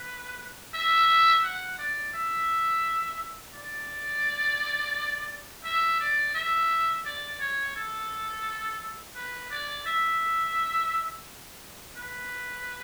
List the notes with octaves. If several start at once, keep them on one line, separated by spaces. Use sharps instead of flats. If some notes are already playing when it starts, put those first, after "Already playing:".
Already playing: B4
E5
F#5
D5
E5
D5
E5
D5
E5
D5
C#5
A4
B4
D5
E5
B4